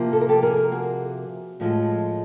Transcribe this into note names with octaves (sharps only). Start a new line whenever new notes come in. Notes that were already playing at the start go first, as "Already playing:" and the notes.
Already playing: C3 F3 A#3
A4
A#4
G4 A4
G#4 A#4
F#4 G#4
A2 F3 G#3